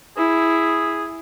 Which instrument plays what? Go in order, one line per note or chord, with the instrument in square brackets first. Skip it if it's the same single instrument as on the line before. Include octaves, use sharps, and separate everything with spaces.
[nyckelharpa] E4 [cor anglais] G#4